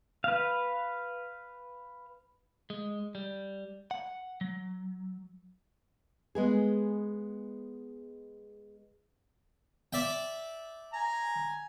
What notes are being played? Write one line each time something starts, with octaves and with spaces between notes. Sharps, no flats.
B4 F5
G#3
G3
F#5
F#3
G#3 B3 G#4
D5 E5 G5
G#5 A#5